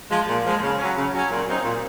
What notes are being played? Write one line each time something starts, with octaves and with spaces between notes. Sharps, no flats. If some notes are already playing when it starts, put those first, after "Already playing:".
F3 G#3
A#2
F3 G#3
C#3
F#3 C#4
C#3
F#3 C#4
A#2
F#3 C4 D#4
A#2